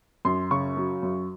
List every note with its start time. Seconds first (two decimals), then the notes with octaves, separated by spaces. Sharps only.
0.25 F#2 C6
0.51 C#3 C#6
0.77 F#3
1.03 F#2